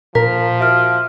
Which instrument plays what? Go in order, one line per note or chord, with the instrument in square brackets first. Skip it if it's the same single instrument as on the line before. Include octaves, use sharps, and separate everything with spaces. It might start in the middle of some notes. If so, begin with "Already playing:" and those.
[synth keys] A#2 [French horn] F3 [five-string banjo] A#4 [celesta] B6
[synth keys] F#4 D7 [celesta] E5 F6